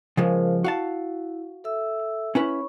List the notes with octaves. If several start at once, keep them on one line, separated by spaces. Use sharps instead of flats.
C#3 F3 G#3 F4 A#4 C5
E4 F#4 F5 A5
A4 E5 E6
C#4 E4 B4 C#5 B5 C#6